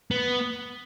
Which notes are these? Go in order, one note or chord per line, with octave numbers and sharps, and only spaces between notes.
B3